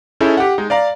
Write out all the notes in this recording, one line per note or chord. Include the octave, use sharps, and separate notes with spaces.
C#4 D#4 E4 G#4 A4
G4 F#5
G#3 D#4
D5 F5 A#5